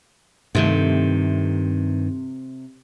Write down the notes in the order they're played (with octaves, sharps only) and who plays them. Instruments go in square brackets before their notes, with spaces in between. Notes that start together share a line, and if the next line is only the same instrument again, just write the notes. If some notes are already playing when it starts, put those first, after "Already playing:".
[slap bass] G2 D#3 [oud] C3 A3